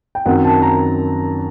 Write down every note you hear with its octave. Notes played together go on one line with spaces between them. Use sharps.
G5
F#2 D#3 F#3 C4 F#5
A5
A#5